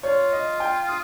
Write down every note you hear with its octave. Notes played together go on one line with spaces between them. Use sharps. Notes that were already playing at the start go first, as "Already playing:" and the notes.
F4 C#5
D#5
G5
D#6